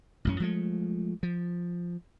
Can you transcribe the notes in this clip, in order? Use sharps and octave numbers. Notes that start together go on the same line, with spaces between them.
A1 F#2 C#4
F3 G#3 A3
F3